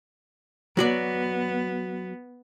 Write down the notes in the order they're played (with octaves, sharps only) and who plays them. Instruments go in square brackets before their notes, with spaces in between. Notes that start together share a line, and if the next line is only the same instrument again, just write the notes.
[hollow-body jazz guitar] F#3 F#4 D5 [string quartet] B3